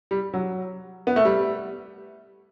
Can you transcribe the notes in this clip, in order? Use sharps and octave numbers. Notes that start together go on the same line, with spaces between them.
G3
F#3
B3
A3
G3